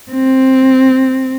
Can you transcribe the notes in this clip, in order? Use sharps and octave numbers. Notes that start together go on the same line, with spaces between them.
C4